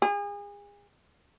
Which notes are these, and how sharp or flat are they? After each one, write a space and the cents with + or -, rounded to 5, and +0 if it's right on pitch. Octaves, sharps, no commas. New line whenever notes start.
G#4 -35